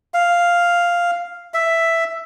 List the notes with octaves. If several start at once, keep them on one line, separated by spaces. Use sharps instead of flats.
F5
E5